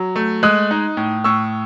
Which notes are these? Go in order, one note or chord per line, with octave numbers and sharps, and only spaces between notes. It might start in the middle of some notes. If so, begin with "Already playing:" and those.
Already playing: F#3
A3
G#3 D#6 F#6
D#4
A2
A2 C#6 E6